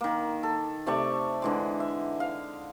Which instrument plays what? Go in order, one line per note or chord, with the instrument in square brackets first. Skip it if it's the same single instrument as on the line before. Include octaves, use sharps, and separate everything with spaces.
[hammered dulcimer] D#3 A#3
A4
C3 A3 D5 C#6
D3 E3 G#3
E5
F5